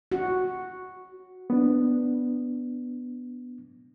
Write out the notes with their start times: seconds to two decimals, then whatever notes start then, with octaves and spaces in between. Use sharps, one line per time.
0.12 F#4
1.50 B3 D4